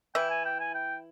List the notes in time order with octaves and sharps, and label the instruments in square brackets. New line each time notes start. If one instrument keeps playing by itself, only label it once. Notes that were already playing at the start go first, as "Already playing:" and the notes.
[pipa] E3 E4 [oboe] G5
[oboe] G#5
G5
G#5
G5